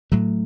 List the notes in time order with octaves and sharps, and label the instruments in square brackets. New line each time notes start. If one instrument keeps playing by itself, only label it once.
[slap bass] A2 F#3 A3